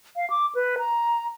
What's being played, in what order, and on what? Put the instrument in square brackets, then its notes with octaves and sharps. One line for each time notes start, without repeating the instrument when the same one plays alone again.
[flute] F5
D6
B4
A#5